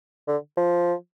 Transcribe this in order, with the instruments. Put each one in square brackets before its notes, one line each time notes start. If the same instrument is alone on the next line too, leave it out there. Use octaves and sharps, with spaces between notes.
[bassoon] D3
F3